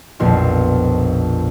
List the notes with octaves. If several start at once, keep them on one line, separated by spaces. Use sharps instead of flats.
A#1 F2 B2 C6